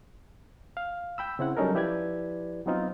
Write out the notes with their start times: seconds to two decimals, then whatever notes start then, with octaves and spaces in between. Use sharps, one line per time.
0.77 F5
1.18 G5 B5 E6
1.39 C#3 C4 E4 F#5
1.57 F#3 G3 C#4 D#4 A4 A#4
1.74 F3 E4 G4 B4 D5 G#6
2.66 F#3 B3 C4 D#4 F4